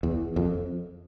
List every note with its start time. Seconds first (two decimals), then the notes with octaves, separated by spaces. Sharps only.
0.03 E2
0.36 F2